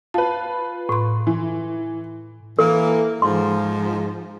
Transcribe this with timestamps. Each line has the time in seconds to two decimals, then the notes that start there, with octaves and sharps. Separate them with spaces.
0.14 F4 B4 A5
0.89 A2 C6
1.27 E3
2.59 E3 A#3 A4
3.22 G#2 F3 C6